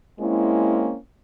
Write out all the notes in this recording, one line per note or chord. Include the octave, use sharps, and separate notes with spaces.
G#3 A#3 C4 C#4 E4